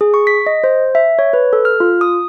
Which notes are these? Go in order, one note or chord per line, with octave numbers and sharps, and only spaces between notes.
G#4
C#6
B6
D#5
C5
E5
C#5
B4
A4
F6
F4
D#6